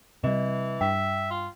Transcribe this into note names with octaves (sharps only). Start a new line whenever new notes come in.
C3 E3 G3 D#5
G2 E5 G5
F4